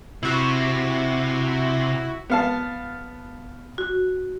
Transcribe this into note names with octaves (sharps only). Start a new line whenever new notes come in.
C3 E4 F#4
B3 F5 A5
F#4